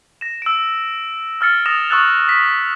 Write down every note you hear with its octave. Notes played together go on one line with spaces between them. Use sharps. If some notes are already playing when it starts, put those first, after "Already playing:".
A#6 E7
E6 D7
E6 F6 A6 C#7
D#6 A6 A#6 E7 F7
C#6 D#6 E6 F#6 A6 F7
B6